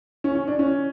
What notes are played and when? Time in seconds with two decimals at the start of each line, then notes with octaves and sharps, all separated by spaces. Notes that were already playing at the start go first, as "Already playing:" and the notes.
0.24 C#4
0.35 C#4
0.47 D4
0.59 C#4